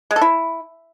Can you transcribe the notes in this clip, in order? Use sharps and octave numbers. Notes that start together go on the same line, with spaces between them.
G#3
A4
E4